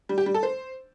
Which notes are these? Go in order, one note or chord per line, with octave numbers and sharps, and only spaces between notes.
G3
G4
G3
A4
C5